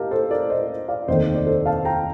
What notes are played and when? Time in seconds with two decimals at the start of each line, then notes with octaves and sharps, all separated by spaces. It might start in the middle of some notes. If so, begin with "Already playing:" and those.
Already playing: G4 A#4 D#5 F5 A5
0.11 A4 C5
0.31 A#4 D5
0.50 C5 D#5
0.88 D5 F5
1.08 F1 D#2 D#3 A3 C5 D#5
1.36 D5
1.46 A4 C5
1.66 F5 A5
1.85 G5 A#5